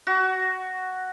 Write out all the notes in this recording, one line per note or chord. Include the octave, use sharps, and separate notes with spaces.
F#4